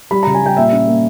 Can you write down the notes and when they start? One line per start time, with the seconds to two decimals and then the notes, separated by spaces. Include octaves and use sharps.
0.11 G3 B5
0.23 C#3 A#5
0.35 G#5
0.42 G3 G5
0.57 A#2 E5
0.72 C#4
0.87 A#3